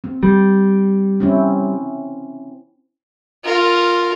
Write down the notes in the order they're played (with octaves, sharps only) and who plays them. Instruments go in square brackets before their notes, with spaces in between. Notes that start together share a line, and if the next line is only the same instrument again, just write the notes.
[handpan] C4
[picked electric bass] G3
[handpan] C4 C#4 E4
[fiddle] F4 A#4